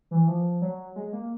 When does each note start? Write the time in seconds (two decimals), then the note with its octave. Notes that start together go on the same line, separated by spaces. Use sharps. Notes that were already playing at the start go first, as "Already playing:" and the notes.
0.11 E3
0.27 F3
0.62 F#3
0.96 G#3
1.13 A#3